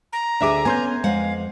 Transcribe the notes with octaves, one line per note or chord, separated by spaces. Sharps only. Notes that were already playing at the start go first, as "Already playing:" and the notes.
A#5
D2 D4 G#4 E5 D6
B3 C#4 G#5 C6 G6
F2 G#3 F5 F#5